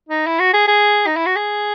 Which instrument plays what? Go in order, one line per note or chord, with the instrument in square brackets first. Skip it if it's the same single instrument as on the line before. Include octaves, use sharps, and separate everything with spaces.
[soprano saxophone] D#4
E4
F#4
G#4
G#4
D#4
E4
F#4
G#4